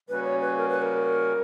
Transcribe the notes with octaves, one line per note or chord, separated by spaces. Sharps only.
C#3 G3 A#3 C#4 F#4 B4
C#5
B4
A#4
B4
A#4